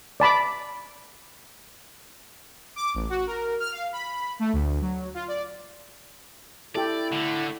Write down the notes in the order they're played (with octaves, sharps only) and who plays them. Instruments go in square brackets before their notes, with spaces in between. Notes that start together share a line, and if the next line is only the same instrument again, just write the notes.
[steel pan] D5 A5 B5 D6
[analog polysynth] D6
A1
F#4
A#4
F6
F5
B5
A3
D2
F#3
F4
D5
[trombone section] E4 [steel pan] G4 A4 [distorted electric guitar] D5
[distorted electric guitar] A2 A3 [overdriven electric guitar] D3